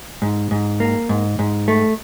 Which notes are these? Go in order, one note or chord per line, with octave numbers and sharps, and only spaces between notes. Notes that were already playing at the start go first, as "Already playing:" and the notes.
G#2
G#2
A#3
G#2
G#2
A3